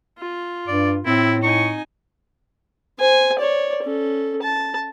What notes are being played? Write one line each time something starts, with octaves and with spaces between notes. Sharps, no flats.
F4
G2 D5
A2 C4 E4
D#4 G#5 C#6
C5 G#5
C#5 D5
C#4 A4
A5